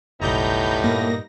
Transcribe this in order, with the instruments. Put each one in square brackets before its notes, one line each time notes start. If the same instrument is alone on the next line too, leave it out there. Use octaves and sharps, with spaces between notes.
[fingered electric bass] F#1 B1 [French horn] A2 [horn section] G3 B3 D#4 [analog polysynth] A#5 G6
[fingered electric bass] G2 A#2 [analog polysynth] A#3 A#6